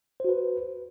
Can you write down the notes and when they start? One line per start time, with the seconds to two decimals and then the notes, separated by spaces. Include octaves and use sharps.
0.20 C5
0.25 F#4
0.29 B4